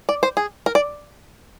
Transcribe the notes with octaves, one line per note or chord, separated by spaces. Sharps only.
D5
C5
G#4
A#4
D5